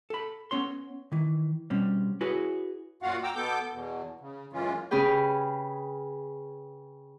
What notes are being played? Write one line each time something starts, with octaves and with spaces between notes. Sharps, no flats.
A4 B5
B3 C#4 C#5 C6
D#3 E3
B2 G3 C4 C#4
E4 F#4 G#4 B4 C#5
F#2 A#2 F4 F#4 F5 F#5
G5 A#5 D6 E6
B2 B3 A4 D6 G6
E2 B2
C#3
F#2 E3 G#3 C#4 F4
C#3 C#4 G#4 B4 G5